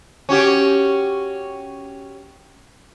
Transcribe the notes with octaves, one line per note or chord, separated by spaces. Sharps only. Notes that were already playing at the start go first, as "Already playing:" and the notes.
C#4 F#4 G4